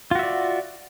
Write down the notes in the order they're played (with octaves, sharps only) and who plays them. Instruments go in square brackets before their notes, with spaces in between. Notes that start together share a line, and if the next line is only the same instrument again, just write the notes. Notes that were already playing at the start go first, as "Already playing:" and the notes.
[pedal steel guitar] F4
F#4
E5
D5